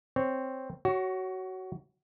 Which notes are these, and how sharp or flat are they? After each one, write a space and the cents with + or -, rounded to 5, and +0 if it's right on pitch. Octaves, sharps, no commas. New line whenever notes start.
C4 +0 C#5 +0
F#4 +20 C#5 +0